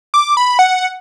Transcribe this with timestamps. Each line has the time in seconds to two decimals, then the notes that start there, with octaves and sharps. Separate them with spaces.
0.14 D6
0.37 B5
0.59 F#5